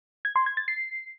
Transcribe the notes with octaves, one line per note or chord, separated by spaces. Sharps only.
G#6
C6
G#6
A6
C7